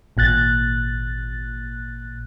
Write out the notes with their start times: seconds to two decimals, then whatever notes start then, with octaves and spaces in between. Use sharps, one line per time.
0.17 G#1 A#2 F#6 A6